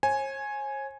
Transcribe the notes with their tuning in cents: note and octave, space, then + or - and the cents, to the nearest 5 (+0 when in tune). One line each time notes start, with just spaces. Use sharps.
C#5 -45 G#5 +5